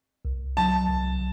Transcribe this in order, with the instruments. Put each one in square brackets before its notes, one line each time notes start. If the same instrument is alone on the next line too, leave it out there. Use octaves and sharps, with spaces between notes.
[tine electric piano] C2
[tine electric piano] F#3 [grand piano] A5
[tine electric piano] C2